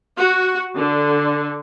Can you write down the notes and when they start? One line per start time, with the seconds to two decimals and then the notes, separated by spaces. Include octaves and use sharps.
0.19 F#4
0.74 D3